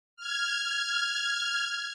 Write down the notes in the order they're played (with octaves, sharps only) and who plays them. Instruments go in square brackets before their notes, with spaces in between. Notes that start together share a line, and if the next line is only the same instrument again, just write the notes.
[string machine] F6 G#6